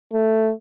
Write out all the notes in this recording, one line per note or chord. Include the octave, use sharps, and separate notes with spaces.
A3